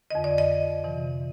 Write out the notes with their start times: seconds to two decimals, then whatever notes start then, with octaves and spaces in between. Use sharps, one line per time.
0.10 F2 D3 D#5
0.24 D5
0.38 D#5
0.84 F2 C3 E3